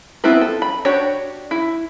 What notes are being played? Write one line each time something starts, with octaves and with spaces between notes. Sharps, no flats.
B3 C4 E4 F4 B4
A4
B5
D4 F#4 G4 C#5
E4